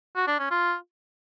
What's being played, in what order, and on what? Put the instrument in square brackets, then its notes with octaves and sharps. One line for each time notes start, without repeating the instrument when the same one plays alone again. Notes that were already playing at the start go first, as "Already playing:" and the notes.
[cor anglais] F#4
D4
C#4
F4